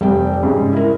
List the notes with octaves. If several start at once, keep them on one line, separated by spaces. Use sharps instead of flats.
F1 C3 G3 G5
G#2 C#3
E4 A#4